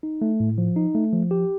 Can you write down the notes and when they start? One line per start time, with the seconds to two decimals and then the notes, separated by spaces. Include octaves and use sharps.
0.03 D#4
0.22 A3
0.40 A2
0.58 F3
0.76 D#4
0.95 A3
1.13 F3
1.31 G4